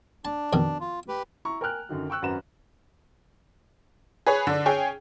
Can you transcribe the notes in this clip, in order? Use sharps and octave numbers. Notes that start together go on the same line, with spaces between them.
D4 A5
F2 B2 D#3
F4
G4 B4
E4 A#5 C#6
A#4 G5 G#5 F6 F#6
F#2 D3 D#3 F#3
G5 C#6 E6 F#6
G#1 F#2 F#4 B4 A#5 E7
G#4 B4 C#5
D3 D4
C#4 G#4 C#5 G5